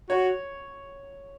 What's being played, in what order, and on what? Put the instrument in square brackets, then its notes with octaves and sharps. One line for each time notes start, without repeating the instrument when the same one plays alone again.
[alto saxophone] F#4 [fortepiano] C#5